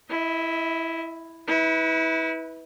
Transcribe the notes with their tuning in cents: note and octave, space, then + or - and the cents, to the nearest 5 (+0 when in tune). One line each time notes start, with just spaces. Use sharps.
E4 +0 D#5 +40
E4 -30 B4 +0